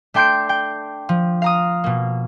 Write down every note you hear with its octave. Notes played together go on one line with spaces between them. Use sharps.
A3 D4 G5 C6 G6 D7
G5
F3
F5 A#5 D#6
B2 A#3